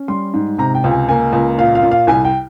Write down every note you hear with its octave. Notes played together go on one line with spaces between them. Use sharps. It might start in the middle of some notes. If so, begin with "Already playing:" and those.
Already playing: C#4
G3 C6
G#2
C3 A#5
G5
C#2
G#5
A#3 G#5
C#2
A#2 F5
F5
A#2
F5
C2 G#5
G5